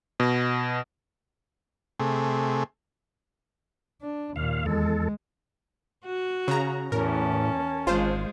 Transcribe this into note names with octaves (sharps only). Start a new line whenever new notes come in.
B2
C3 A3 G#4
D4
D#2 A#2 F5
E2 G#3 A4
F#4
C#3 A#5
E2 A2 C#4 A#4 A5
G#1 G#3 F4 C5